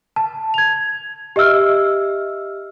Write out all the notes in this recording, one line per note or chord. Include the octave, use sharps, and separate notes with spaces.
A5
G#6 F7
G4 D#5 E5 E6 F6